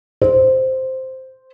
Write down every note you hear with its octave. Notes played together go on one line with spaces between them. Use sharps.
C5